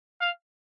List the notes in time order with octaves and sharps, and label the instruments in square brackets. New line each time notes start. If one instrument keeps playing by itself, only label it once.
[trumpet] F5